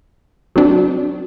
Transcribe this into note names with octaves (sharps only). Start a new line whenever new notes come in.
F#3 C4 D4